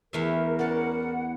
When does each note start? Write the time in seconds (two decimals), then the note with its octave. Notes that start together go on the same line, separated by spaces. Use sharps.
0.13 E2 A3 E4 A#4 E5
0.59 C#4 D5 F#5 A5